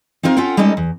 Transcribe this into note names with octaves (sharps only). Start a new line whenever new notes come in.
C4 D#4 F4 A#4 C5
C#4 F4 A4 F#5 G5
G3 G#3 C#4 D#4 A4 A#4
E2